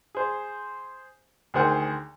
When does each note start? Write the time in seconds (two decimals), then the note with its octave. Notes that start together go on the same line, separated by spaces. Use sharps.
0.15 G#4 C5
1.54 D2 D#3 G#4 C5 F#5 G5